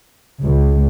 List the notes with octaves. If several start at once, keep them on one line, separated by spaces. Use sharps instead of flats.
C#2